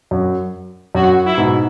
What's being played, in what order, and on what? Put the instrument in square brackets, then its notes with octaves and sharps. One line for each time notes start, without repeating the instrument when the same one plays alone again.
[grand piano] F#2
[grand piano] F#2 [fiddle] F#4
[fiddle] E4
[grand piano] G#2 B2